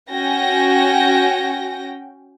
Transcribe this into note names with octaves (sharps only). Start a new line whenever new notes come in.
C#4 F#4 G5 A#6